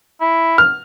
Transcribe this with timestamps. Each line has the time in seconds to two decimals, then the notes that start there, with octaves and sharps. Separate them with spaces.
0.21 E4
0.58 F6